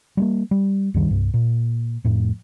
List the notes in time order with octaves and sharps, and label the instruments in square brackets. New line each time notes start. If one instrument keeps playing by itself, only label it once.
[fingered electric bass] G3 A3 A#3
G3
C#2 F#2 D#3 G3
C2 G2
A#2
F2 A2